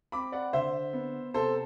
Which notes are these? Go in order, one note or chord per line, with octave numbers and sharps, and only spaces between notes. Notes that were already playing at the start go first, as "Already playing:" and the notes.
C4 B5 D6
D5 F#5
D3 C5 E5
B3
C3 A4 C5